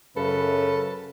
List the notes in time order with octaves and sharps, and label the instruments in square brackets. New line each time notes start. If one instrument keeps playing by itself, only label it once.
[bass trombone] F#2 [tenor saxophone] C#3 [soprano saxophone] A4 [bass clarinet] B4